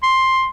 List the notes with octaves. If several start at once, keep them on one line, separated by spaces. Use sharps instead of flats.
C6